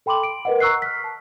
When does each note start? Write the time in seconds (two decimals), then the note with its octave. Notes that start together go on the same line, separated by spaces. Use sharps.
0.06 A4 G5 B5 C6 D6 F#7
0.23 D7
0.45 A#4 B4 D#5 F#5
0.60 A#5 C#6 E6 F#6 C7
0.82 F6 B6
1.04 A5